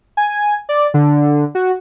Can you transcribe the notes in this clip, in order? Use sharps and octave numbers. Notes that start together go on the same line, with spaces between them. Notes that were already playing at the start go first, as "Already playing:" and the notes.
G#5
D5
D3
F#4